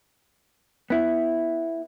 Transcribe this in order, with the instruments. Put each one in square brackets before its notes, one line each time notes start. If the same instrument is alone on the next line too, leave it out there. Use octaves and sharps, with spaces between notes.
[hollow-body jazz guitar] B3 E4